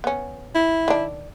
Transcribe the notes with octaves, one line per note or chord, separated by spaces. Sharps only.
B3 C#4
E4
D#3 D4